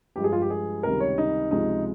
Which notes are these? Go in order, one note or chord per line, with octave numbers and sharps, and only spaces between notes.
G2 F3 G#3 G4
G#4
F4
G4
G#4
C#2 C3 D#3 G3 A#4
C#5
D#4
C#2 C3 F3 G#3 D#4